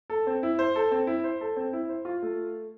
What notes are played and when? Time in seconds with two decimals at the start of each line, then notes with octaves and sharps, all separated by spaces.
0.10 A4
0.27 C4
0.43 E4
0.59 C5
0.76 A4
0.91 C4
1.07 E4
1.24 C5
1.41 A4
1.57 C4
1.73 E4
1.89 C5
2.05 F4
2.23 A3